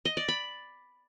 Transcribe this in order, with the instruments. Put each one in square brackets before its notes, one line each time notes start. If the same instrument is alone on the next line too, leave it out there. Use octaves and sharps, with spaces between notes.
[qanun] D#5
D5
B5